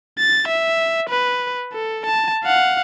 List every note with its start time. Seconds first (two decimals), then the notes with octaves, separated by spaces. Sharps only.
0.19 A6
0.48 E5
1.10 B4
1.73 A4
2.06 A5
2.44 F5 F#5